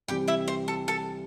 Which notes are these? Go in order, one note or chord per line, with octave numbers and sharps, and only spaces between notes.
C2 C3 E3 G3 C4 G4 G5
E4 E5
C5
A4
A4